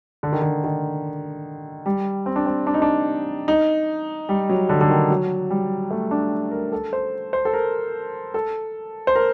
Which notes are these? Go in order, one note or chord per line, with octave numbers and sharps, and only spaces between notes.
D3
D#3
D3
D#3
G3
C4
D4
C4
D4
D#4
D4
D#4
G3
F#3
D3
D3
D#3
F#3
G3
A3
D4
A#4
A4
C5
C5
A4
A#4
A4
C5
A#4